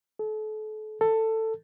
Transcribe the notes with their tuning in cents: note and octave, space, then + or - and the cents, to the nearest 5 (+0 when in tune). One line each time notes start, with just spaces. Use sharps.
A4 -35
A4 +15